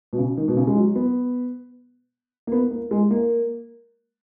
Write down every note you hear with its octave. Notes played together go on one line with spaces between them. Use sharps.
B2
C#3
D#3
B2
C#3
G#3
F#3
B3
A#3
B3
A#3
G#3
A#3